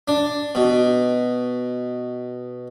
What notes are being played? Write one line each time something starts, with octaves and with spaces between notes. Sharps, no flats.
D4
B2